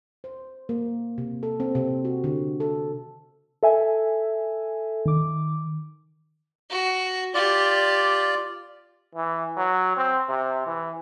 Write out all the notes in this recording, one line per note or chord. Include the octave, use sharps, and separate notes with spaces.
C5
A#3
C3
A4
C4
C3
F#4
D3
A4
A4 E5 G#5
D#3 D6
F#4
F4 G4 D5
E3
F#3
C4
C3
E3